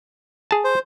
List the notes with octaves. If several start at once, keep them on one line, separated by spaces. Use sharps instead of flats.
G#4 A5
C5